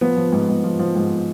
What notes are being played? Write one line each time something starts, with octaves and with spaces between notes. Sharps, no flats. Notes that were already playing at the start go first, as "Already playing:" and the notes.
F3 B3
F3
G#2
G#2
F3
F3
G#2